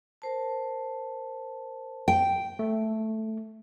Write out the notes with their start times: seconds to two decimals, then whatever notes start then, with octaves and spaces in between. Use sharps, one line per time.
0.22 A#4 C5 A5
2.08 G5
2.59 A3